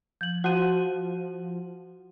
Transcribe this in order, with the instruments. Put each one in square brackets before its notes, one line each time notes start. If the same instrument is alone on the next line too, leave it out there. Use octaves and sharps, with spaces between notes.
[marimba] F3 [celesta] G6 F#7
[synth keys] F3 [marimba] F#4 [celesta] F#5 C6 D#7